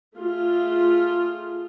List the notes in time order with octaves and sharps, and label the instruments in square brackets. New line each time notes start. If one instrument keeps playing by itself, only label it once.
[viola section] A3 F4 G#4